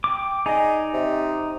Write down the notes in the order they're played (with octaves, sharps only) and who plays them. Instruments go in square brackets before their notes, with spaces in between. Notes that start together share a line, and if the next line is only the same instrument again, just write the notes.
[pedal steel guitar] G5 D6
[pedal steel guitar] D#4 D5 D#5 [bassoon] G#4
[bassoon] C3